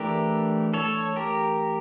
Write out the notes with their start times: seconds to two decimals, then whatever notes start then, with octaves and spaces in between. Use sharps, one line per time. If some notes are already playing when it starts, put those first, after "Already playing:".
Already playing: E3 A3 D4 G4 A#4
0.74 A4 C#5
1.16 G4 A#4